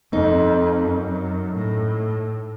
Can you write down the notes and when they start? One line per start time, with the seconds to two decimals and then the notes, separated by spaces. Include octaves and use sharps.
0.12 F2 D#4
0.84 F#2
1.56 A2